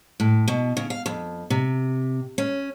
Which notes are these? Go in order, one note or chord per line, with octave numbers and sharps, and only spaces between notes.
A2
B2
C#3
F5
F2
C3
C#4